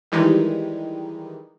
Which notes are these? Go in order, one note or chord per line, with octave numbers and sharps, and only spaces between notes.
D#3 E3 G3 G#3 D#4